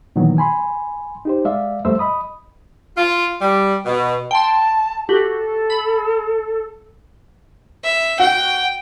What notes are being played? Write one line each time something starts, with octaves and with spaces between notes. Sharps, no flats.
A#2 D#3 E3 F#3 B3
G#5 B5 C6
D#4 G4 C5
G#3 D5 E5 F5
F2 G3 A3 C5 E5 E6
D#5 B5 D#6
F4
G3
B2
G5 A5 C6
F#4 G4 A4
B5
E5
F#4 G5